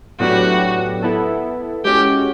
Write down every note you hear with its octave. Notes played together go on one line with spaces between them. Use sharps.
A2 F#3 B3 D4 F#4 G4
B3 E4 A4
G#3 C#4 F#4 G4